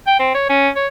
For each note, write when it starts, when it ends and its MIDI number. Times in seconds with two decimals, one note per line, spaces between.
0.07 0.15 79
0.19 0.32 60
0.34 0.48 73
0.49 0.69 61
0.76 0.87 73